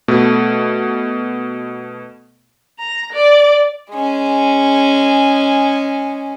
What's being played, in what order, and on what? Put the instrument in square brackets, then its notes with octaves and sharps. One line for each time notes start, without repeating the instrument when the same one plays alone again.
[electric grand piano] B2 A3
[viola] A#5
D5
[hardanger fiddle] G#3 C#4